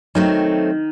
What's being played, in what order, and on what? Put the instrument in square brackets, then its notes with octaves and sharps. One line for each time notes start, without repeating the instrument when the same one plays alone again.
[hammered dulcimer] D#3 [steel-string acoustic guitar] F#3 A3 C4